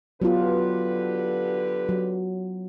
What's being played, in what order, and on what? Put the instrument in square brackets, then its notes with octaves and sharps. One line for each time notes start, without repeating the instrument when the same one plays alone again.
[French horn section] D3 G4 B4 [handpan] F#3 B3 F4
[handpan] F#3